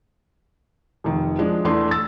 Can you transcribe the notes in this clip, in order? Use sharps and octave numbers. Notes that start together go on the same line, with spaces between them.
F1 D#3
F3 G#3 D4
E2 E3 A3 D4 E4 C6
E6 A6